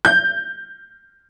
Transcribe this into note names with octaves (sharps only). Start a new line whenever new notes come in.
G6